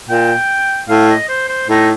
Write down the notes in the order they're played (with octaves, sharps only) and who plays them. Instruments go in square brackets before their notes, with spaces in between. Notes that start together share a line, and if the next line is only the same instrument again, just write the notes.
[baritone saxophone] A#2 [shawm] G5
[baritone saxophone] A2 [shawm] F5
[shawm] D#5
C5
C5
[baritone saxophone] A2 [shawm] D#4